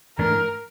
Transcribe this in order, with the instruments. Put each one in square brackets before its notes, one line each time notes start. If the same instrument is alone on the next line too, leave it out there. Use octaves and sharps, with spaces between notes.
[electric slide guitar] G#2 E3 A3 D4 [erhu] A#4